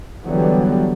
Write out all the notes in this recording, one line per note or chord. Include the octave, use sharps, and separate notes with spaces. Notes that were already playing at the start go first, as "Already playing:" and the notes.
D3 E3 F#3 G3 B3